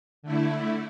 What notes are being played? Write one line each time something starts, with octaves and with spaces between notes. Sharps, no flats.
D3 A3 E4